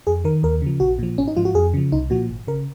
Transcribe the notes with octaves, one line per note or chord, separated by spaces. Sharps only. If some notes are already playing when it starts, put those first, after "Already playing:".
F2 G#4
D#3 A#4
D#2 A#4
C#3 F3
A#1 F#4
A#2 F3
G#1 C#4
D#4
G#2 F3 F4
F#4
F2 G#4
C#3 F3
C2 D#4
A#2 F3 F#4
G#1
C#3 A#4